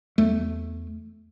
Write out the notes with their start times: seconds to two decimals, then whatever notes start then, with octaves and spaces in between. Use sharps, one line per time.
0.18 E2 A3